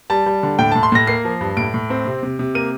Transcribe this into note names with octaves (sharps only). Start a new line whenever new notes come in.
G3 A5
G3
D3
A2 G5
A2 A5
C6
A2 A#6
A#3 C7
F3
G2
A2 D7
A2
C4
C3
C3
C3
A#3 D#7